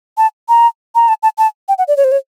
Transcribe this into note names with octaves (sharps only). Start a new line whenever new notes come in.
A5
A#5
A#5
A5
A5
A5
G5
F#5
D5
C#5
C5
C#5